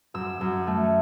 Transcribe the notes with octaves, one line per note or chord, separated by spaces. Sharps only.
F#2 E6
F#2
A3